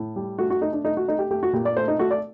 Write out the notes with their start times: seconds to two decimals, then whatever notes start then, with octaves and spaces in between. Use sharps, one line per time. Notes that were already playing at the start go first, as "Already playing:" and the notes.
Already playing: A2
0.16 G3
0.38 A3 F#4
0.50 F#4
0.62 A3 D#4
0.73 D4
0.85 A3 D#4
0.97 F#4
1.08 A3 D#4
1.19 G4
1.31 A3 G4
1.43 F#4
1.53 A#2 G4
1.65 D5
1.77 A3 C5
1.88 D#4
1.99 A3 F#4
2.11 D5